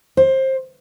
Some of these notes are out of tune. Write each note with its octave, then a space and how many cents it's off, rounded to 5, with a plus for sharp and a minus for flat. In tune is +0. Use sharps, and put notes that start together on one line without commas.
C5 +20